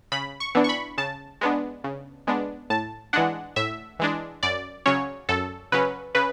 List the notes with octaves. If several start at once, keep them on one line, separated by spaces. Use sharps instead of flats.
C#3 B5
C#6
E3 B3 D4
C#6
B5
C#3 A5
G#3 B3 D4
C#3
G#3 B3 D4
A2 A5
E3 G#3 D4 F#5
A2 E5
E3 G#3 D4
F#2 D5
C#3 F#3 C#4 C#5
F#2 A4
C#3 F#3 C#4 B4
C#3 B4